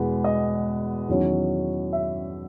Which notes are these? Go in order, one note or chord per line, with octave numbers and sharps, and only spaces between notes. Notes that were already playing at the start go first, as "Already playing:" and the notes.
Already playing: E2 B2 G#3 B3
D#5
E2 D#3 F#3 C#4
E5